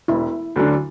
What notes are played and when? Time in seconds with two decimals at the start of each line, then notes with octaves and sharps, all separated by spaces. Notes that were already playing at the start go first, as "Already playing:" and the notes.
0.08 E1 E4
0.56 D2 D3 F#3 D4